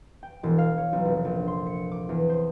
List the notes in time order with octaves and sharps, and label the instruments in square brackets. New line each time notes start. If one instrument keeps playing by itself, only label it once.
[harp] G5
E1
F5
C#5
B1
F1
A#1
C6
C#7
D6
E2
C5